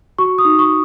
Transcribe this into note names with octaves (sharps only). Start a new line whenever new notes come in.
F#4 C#6
D#6
D#4
C#6